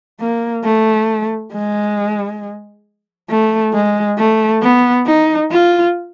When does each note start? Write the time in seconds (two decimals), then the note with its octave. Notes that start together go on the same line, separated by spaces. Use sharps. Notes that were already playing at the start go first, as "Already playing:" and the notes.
0.20 A#3
0.64 A3
1.53 G#3
3.30 A3
3.74 G#3
4.18 A3
4.63 B3
5.07 D#4
5.51 F4